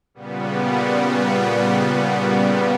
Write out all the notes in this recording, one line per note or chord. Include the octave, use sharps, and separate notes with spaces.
A#2 C#3 G3 B3